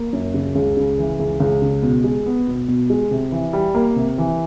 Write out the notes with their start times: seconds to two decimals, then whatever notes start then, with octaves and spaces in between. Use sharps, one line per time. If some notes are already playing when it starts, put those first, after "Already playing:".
Already playing: A#3
0.13 F#2
0.34 C#3
0.55 C#2
0.77 C#3
0.98 E3
1.19 C#2
1.40 C#2
1.62 C#3
1.83 B2
2.04 G#3
2.26 B3
2.47 B2
2.68 B2
2.90 G#3
3.11 C3
3.32 E3
3.53 G3
3.75 A#3
3.96 C3
4.18 E3